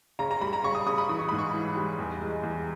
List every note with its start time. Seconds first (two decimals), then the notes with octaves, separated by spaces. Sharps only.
0.19 C#3 A#5
0.31 A#5
0.41 G3 B5
0.53 A#5
0.64 C#3 C#6
0.75 D#6
0.86 C#3 D#6
0.98 B5
1.09 E3 D#6
1.19 C#6
1.29 G#2 B5
1.39 C#6
1.54 E3
1.76 G3
1.99 E2
2.21 G#3
2.43 E2